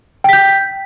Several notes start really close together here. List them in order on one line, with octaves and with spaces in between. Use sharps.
G5 B6 G6